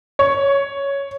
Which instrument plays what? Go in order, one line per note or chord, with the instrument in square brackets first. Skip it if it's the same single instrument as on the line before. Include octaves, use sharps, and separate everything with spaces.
[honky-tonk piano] C#5